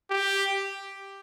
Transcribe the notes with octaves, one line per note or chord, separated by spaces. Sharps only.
G4